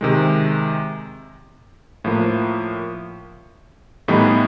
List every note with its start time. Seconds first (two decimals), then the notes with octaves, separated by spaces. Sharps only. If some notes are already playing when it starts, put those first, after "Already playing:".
0.01 C3 D#3 G#3
2.04 A2 F3 A#3
4.08 A2 E3 G3 B3 D#4